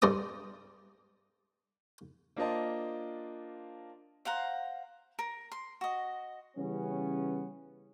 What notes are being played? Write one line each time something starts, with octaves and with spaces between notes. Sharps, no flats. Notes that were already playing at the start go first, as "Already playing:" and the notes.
G2 C5 D5 A#5 D#6
A#3 D4 F4 C5 D#5 A5
C5 F5 F#5 A#5
A#4
C6
F#4 D#5
C#3 E3 G3 B3 C#4